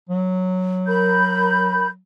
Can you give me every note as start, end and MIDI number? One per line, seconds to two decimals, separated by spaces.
0.09 2.00 54
0.87 1.88 70
0.87 1.88 83
0.87 1.88 91